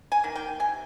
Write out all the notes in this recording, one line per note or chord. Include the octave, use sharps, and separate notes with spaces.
G#5
D#3 A#3
G5
C3 G#5